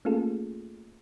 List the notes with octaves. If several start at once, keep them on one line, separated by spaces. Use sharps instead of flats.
A3 A#3 C#4 F4 G#4 A4